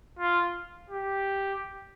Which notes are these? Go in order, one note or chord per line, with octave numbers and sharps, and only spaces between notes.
F4
G4